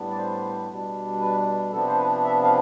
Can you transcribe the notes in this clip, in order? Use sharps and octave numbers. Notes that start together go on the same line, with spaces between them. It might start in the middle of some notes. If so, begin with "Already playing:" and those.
Already playing: A2 G3 B3 D4
D5
C5
B2 G3 D4
B4
C3 F3 B3 D4 A4
C5
B4
E5
F5